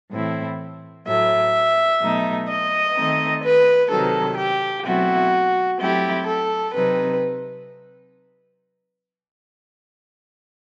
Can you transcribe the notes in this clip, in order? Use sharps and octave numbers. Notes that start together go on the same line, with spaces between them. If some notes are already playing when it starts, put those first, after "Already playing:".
A2 E3 A3 C4 E4
A2 F#3 A3 E5
B2 F#3 A3 D#4
D#5
D#3 A3 C4 D#4
B4
C3 D#3 F#3 A4
G4
B2 F#3 A3 C4 E4 F#4
F#3 A3 C4 E4 G4
A4
C3 F#3 C4 D#4 B4